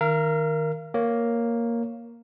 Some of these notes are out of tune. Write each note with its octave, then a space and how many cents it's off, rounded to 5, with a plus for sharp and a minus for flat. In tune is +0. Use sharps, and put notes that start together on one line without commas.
D#3 +0 A#4 +0 F5 -40
A#3 +0 C#5 +5